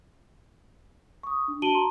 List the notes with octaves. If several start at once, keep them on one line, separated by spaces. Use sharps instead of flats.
C#6 D#6
D4
F#4 A5 D7 D#7 F#7 G7
A#5 C6